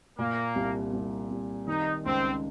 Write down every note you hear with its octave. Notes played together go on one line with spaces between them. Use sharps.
A#2 A#3
C2
C2
C2
D#3 D#4
C#2 C4